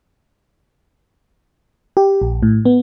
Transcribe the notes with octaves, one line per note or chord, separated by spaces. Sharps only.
G4
A#1
A2
B3